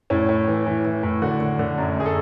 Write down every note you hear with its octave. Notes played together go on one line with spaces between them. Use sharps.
A2 C#4
A2
E3
E3
E3
A2
D3 F#4
D3
D3
F#2
F#2 G#4
A4